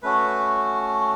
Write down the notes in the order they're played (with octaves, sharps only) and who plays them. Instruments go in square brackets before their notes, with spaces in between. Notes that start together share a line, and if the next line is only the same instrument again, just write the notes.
[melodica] A3 C#4 F#4 B4